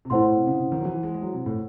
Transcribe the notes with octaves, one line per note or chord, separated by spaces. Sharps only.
C3
A2 E4 C5 F#5 C6
A2
C3
C#3
C#3
D#3
F#3
E3
G#3
G#3
F#3
C3
A2